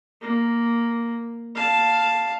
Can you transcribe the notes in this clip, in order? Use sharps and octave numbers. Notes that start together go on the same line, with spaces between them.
A#3
F5 A5